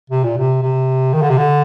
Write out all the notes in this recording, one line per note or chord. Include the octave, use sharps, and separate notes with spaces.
C3
A#2
C3
C3
D#3
D3
C3
D3